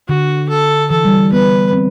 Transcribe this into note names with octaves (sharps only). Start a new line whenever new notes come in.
D3 F#4
A4
E3 A4
G3
G3
B3 B4
C4